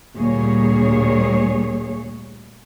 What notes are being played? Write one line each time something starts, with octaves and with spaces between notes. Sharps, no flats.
D2 A#2 G3 A#3 G#4 C#5